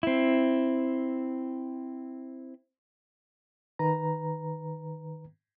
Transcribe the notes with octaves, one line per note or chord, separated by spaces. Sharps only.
C4 E4
D#3 B4 A#5